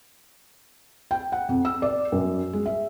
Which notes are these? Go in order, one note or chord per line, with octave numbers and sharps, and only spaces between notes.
G5
F#5
F2
E6
D5
F#2
G#3
E5